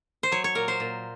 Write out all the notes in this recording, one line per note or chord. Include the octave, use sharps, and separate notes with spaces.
C5
F#3 C#5
C#5
A#2 A#4
C5
A#2